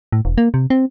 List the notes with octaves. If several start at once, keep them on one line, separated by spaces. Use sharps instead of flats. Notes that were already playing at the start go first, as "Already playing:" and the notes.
A2
E1
A#3
C3
C4